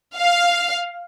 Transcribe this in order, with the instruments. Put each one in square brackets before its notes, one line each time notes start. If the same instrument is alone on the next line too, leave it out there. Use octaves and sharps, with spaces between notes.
[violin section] F5